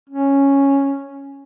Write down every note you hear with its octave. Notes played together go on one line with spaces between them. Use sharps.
C#4